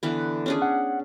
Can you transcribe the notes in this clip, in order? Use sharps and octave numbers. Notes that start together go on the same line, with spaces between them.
D3 E3 B3
C#4 D4 G#4
F#5